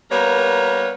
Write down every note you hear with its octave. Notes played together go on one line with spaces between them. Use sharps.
G3 A#3 B3 A#4 B4 C#5